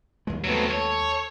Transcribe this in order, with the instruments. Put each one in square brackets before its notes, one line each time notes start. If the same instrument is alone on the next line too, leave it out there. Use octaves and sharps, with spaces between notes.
[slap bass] D#2 G#3
[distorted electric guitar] F#3 C4 [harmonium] A3 B3
[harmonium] A4 [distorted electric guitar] C#5